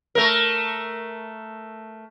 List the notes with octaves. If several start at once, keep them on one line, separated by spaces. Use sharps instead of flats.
A3 A#4